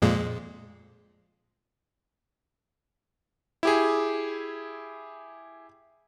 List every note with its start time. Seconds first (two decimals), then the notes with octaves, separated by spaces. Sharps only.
0.02 F2 A#2 G#3
3.63 E4 G4 G#4